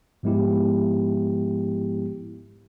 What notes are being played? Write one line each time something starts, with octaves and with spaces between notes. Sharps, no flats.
G#2 F3 G#3 B3 E4 G4